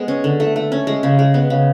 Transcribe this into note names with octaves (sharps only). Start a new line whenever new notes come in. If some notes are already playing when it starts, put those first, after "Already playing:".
Already playing: G#3 B3
C#4
D3
A3
A3
C#4
G#3
C#3
G#3
B3
C#3